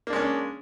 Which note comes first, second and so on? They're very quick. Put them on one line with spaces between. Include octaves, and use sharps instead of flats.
A#3 D4 G#3 C#4